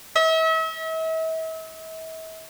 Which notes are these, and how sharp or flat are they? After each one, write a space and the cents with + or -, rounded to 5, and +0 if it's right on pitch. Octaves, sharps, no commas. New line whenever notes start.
E5 -40